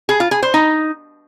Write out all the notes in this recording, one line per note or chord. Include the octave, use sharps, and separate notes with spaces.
G#4
F4
G#4
C5
D#4